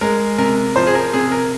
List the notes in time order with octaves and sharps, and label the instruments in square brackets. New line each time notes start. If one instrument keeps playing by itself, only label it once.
[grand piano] G#3 A#4
C3 A#4
F3 C5
G#4
A#4
C3 G#4
A#4